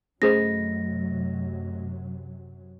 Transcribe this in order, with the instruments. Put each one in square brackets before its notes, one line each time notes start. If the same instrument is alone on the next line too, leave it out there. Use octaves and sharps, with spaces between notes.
[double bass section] F#2 C3 F#3 [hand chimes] A3 A#6 [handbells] C#4 G#4 C5